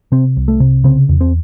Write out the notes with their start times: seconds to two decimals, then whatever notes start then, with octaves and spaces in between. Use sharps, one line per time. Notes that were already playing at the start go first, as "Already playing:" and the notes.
0.12 C3 C4
0.37 C2
0.48 A3
0.60 C3
0.84 C#3 C4
1.09 E2
1.21 C4